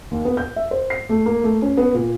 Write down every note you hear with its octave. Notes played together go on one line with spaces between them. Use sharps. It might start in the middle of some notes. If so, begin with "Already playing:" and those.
D#2
B3
G6
E5
C5
C7
A3
A#3
A3
C#4
B3
A#2